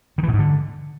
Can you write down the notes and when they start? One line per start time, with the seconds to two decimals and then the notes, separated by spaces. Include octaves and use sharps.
0.18 D#3
0.23 E3
0.28 B2
0.33 G#2
0.39 D3